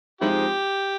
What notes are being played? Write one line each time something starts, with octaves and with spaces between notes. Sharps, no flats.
F3 G#3 C4 D#4 E4 G4